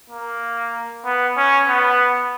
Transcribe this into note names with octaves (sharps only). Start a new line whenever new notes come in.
A#3
B3
C#4
B3